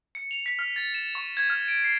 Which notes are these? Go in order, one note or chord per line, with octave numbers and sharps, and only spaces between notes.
C#7
F7
B6
F6
A6
E7
C#6
G#6
F6
D7
C7